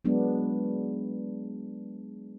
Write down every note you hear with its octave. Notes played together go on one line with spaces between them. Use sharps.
F#3 G#3 B3 D4